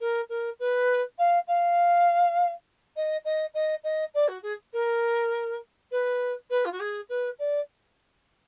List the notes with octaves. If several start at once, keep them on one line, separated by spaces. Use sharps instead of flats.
A#4
A#4
B4
F5
F5
D#5
D#5
D#5
D#5
D5
F#4
G#4
A#4
B4
B4
F4
F#4
G#4
B4
D5